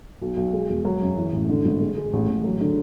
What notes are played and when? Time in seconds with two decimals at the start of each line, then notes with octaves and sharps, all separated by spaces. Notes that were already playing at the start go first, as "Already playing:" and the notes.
0.22 B1
0.37 B1
0.53 G#3
0.70 E1
0.85 F#3
1.01 F#2
1.16 E3
1.32 A1
1.49 D3
1.65 G#1
1.81 G#3
1.97 G#3
2.13 A1
2.28 A1
2.44 F#3
2.61 D3